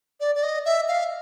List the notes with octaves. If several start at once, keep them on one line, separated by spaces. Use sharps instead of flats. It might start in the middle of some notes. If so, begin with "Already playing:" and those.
D5
D5
D#5
E5
F5